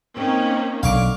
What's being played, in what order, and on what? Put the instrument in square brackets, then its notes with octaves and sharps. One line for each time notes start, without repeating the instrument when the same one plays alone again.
[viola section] A#3 C#4 D#4 [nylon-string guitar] C4
[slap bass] B1 [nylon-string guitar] D3 [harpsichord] F5 C#6 D6